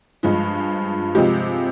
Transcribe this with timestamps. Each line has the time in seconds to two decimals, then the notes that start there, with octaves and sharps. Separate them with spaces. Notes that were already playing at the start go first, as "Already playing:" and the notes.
0.23 G2 F3 G#3
1.15 C3 F3 G#3 G4